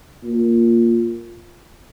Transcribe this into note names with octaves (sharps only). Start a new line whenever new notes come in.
A#2